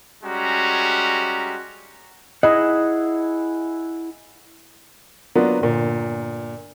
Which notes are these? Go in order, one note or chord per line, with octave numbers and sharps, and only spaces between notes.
G3 G#3 C#4 F#4 A#5
E4 G#4 D#5 F#5
F#3 A#3 B3 D4 F4 F#4
G1 A#2